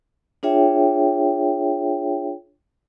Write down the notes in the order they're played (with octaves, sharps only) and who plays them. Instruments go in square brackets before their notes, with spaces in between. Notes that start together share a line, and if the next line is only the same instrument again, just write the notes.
[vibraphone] D4 F4 G#4 C#5 E5 G5